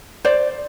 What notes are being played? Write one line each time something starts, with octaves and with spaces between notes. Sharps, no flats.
C5 D5